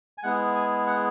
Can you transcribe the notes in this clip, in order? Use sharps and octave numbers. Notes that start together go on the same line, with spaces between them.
G#5
G#3 B3 E4 G#4 F#5
G#5
F#5